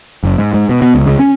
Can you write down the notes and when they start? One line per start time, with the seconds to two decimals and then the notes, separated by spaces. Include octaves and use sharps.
0.23 F#1
0.38 G#2
0.54 G#2
0.69 B2
0.82 B2
0.95 C#2
1.07 C#2
1.19 C#4